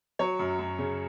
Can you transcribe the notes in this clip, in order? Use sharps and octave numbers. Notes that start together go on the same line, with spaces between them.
F#3 C#5
F#2
F#2
C#3